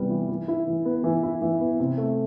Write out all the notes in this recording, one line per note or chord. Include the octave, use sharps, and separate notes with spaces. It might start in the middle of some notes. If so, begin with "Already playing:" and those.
Already playing: C3 E3 G3 B3
E3
E3
E4
E3
B3
E3
E4
E3
B3
C3
A3